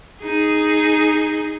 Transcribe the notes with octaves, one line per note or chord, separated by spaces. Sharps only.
D#4 G#4